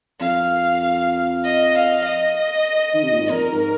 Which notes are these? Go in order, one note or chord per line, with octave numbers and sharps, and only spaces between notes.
F2 F5
D#5
F5
D#5
D#3
C3
A#2
G#2
F2 A#4
G#2